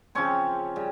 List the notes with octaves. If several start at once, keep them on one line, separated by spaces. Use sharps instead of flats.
C#3 F3 C4 C#4 C#5
C#3 G3